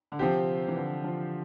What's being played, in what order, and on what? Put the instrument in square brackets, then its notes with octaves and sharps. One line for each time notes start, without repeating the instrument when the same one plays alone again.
[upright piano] D3
[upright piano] C3 [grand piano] F3 C4 G4
[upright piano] E3
D3
F3